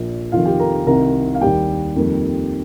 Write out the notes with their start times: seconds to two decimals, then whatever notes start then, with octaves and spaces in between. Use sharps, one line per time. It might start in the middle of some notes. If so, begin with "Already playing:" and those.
Already playing: A#1 A#2 A#3
0.32 F1 F2 D#3 F4 F5
0.45 G4 G5
0.59 A#4 A#5
0.87 C2 C3 D#3 A#4 A#5
1.35 F5
1.41 D#2 D#3 G3 A#3 G4 G5
1.96 F2 D#3 G3 A#3